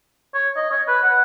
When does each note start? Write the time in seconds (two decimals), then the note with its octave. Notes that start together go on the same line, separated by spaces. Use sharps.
0.34 C#5
0.56 D#5
0.71 C#5
0.88 B4
1.03 F#5